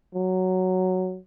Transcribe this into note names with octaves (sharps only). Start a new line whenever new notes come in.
F#3